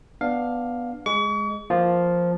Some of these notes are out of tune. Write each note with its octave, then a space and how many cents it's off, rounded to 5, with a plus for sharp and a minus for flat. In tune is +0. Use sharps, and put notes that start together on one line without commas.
B3 +0 D4 +5 F5 +10
G#3 +0 C#6 +40
F3 +0 A#3 +0 F4 +0